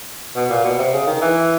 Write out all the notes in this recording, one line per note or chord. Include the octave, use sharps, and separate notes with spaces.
B2
A#2
B2
C3
C#3
D#3
E3